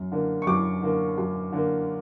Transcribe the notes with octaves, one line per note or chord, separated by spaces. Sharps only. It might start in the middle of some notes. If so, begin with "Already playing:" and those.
Already playing: F#2
D3 A#3
C#6
F#2 D6
D3 A#3
F#2
D3 A#3